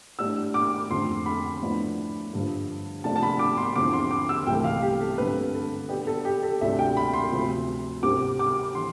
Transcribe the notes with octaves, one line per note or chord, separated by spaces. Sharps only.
A2 G3 D4 E6
D6
F2 D3 A3 C4 C6
B5
A2 F3 B3 D4
G2 D3 F3
C3 F3 A3 D4 A5
A5
B5
D6
C6
E2 D3 F3 C4 E4 D6
C6
D6
E6
C2 C3 E3 A3 G5
F5
G4
A4
G2 D3 A3 C4 B4
A4
B2 B3 D4 G4
A4
G4
A4
D2 C3 G3 D4 E5
G5
B5
C6
D2 C3 F3
C3 G3 C4 D6
D6
E3 C6